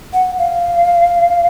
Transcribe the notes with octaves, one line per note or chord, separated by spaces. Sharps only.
F#5
F5